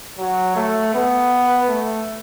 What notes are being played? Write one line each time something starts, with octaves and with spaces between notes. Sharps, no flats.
F#3
A3
B3
A3